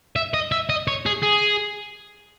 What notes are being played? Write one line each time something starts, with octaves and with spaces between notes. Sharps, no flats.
E5
D#5
E5
D#5
C#5
G#4
G#4